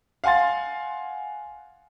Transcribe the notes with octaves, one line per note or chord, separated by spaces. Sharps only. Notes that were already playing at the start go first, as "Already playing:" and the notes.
F5 F#5 G#5 C6 A6